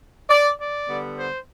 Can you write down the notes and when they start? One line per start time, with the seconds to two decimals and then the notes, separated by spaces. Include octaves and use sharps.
0.30 D5
0.59 D5
0.88 D3 G3 B3
1.18 C5